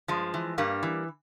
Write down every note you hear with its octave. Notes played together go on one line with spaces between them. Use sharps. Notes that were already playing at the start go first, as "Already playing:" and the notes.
G2 F3 G#3
E3
G2 G3 A#3
E3